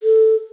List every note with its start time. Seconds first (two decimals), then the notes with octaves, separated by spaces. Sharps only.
0.03 A4